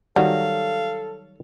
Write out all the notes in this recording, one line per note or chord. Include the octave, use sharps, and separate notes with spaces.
D#3 F#3 G3 A4 F5